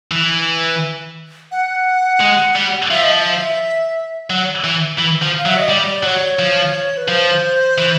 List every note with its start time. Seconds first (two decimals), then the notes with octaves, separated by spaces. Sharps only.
0.11 E3
1.51 F#5
2.21 G#3
2.56 G3
2.90 F3 E5
3.03 D#5
3.15 E5
4.30 F#3
4.64 E3
4.99 E3
5.22 F3
5.38 F5
5.46 F#3
5.48 E5
5.58 D#5
5.69 G3 D5
6.04 F#3 C#5
6.39 F3
6.97 B4
7.08 F3 C5
7.78 E3